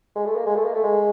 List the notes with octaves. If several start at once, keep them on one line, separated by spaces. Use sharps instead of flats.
G#3
A3
A#3
G#3
A3
A#3
A3
G#3